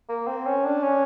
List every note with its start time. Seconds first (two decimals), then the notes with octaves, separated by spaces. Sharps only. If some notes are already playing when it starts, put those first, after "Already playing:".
0.09 A#3
0.27 C4
0.46 C#4
0.65 D4
0.83 C#4